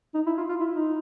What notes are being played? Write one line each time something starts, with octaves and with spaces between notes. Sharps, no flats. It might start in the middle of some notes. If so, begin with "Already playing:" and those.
D#4
E4
F4
F4
E4
D#4